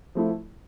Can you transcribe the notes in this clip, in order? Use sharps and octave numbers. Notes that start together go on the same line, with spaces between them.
F3 A3 E4